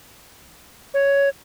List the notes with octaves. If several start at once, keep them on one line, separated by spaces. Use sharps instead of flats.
C#5